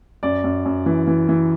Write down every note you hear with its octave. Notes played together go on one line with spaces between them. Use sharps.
F#2 D5
F#2
F#2
E3
E3
E3